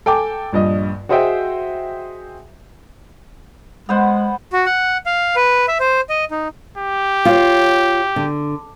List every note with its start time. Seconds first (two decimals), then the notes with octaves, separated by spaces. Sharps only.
0.06 A4 G5 G#5 D6
0.53 A#1 G2 D#5
1.09 F#4 G#4 C5 D#5 E5 G5
3.89 G#3 B3 C5 F#5
4.53 F#4
4.66 F#5
5.06 F5
5.36 B4
5.68 E5
5.80 C5
6.09 D#5
6.31 D#4
6.78 G4
7.25 F4 C#5
8.16 D3